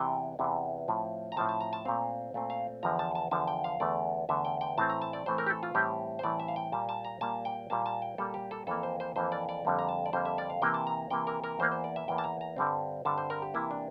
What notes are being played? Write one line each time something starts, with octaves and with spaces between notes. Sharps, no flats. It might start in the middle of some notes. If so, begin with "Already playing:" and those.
Already playing: E2 C3 E3 G5
E2 C3 E3
A2 F3 C4
A#5
A2 F3 C4 A5
A5
A#5
A5
A#2 A3 C4 F5
A#2 A3 C4
F5
E2 D3 F3 A#5
A5
A5
E2 D3 F3 A5
G5
F5
E2 D3 A3 D5
E2 D3 A3 E5
G5
G5
A2 E3 A3 C4 A5
A#5
A5
D5
A2 E3 A3 C4 C5
A#4
G4
A4
F4
A2 E3 G3 C4 G4
C5
A2 E3 G3 C4 D5
E5
F5
G5
A#2 G3 A#3 A5
A5
A#5
A#2 G3 A#3 A5
G5
A#2 G3 A#3 A5
A5
G5
A#2 G3 A#3 A4
G4
A4
F2 E3 A#3 A4
C5
C5
F2 E3 A#3 C5
D5
D5
F2 D3 G3 A#3
A#5
A5
D5
F2 D3 G3 A#3 C5
E5
D5
F5
C3 E3 A#3 G5
A5
A#5
C3 E3 A#3 G5
A#4
A#4
E2 E3 A#3 C5
C5
D5
E5
E2 E3 A#3 G5
A5
A#5
A#5
G2 D3 G3 C4
G2 D3 G3 C4 A5
C5
A#4
G4
C3 E3 A#3 E4
D4